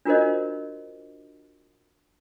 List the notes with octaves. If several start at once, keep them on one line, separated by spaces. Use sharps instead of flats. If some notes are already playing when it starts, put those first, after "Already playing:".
D4 F4 F#4 A#4 C5 D#5